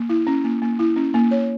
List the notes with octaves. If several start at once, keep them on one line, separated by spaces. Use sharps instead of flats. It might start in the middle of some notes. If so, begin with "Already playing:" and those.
Already playing: A#3
E4
C#4
A#3
A#3
E4
C#4
A#3
C#5